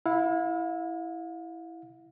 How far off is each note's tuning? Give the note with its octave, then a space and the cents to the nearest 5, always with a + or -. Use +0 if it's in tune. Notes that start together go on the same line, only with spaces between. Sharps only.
E4 +0 F5 +40